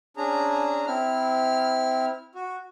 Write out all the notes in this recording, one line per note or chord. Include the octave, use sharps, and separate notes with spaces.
C#4 D4 G#4 A#5
C4 E4 F6
F#4